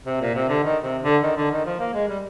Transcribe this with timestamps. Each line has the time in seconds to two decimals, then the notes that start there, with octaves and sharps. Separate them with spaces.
0.06 C3
0.21 A#2
0.35 C3
0.49 D3
0.64 D#3
0.83 C3
1.03 D3
1.23 D#3
1.37 D3
1.51 D#3
1.65 F3
1.80 A#3
1.94 G#3
2.08 G3